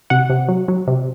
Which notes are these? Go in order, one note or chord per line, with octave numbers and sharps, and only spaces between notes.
C3 F#5
C3
F#3
F#3
C3